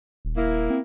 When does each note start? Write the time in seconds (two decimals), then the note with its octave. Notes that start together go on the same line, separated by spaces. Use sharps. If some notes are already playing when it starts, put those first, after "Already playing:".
0.25 D#1
0.36 A#3 E4
0.70 C4